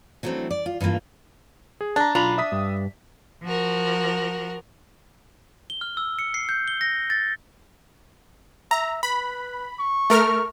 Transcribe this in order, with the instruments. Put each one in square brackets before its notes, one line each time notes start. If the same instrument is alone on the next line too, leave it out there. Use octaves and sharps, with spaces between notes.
[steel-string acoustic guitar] E3 F#3 A3 A#3 C4 D4
D5
F4
G2 E3 A3 A#3 F4
[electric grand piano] G#4
[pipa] D4 [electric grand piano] A5 A#5
[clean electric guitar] B1 A#5 B5 [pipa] D4 [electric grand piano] F4
[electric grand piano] E5 D#6 B6
[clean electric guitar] G2
[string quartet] F3 F#4 A#4
[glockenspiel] G7
F6
E6
C#7
C7
G6
G7
A#6
A6
[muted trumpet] E5 [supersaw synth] A#5
[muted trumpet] B4 [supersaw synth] B5
[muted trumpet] C#6
[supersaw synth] A3 A#4 F6